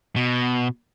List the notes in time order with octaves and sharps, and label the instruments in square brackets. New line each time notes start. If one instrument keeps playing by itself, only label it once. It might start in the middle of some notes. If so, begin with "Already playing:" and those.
[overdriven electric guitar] B2